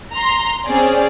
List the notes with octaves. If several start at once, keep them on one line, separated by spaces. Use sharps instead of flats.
A#5 C6
C4 C#4 G#4 D5